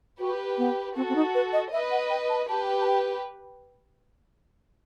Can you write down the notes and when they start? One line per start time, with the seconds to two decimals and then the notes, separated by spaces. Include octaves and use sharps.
0.19 F#4 G4 B4
0.58 B3
0.95 C4 F#4 A4
1.09 C4
1.15 D#4
1.35 B4
1.53 D#5
1.72 B4 D#5 E5
1.91 F#5
2.10 G5
2.29 A5
2.49 G4 B4 A5
2.81 A5
2.87 G5